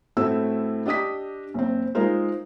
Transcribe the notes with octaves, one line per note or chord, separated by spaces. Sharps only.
A2 A3 C4 E4 F#4 E6
D4 G4 D#5 D#6 B6
F#1 C4
G#3 D#4 F4 A#4 C5